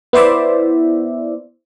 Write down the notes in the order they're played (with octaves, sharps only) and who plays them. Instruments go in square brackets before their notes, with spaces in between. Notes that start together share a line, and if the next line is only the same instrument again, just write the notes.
[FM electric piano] B3 E4 C5 D5 E5